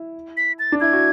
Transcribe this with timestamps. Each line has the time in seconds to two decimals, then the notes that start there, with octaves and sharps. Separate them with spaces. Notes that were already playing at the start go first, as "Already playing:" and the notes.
Already playing: E4
0.37 B6
0.59 A6
0.72 D4
0.80 E4 G#6
0.93 F#4